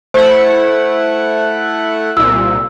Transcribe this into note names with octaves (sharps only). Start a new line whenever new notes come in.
A3 E4 C5 F#5
C2 A#2 E6